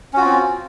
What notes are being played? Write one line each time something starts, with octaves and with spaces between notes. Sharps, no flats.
C4 C#4 F4 F#4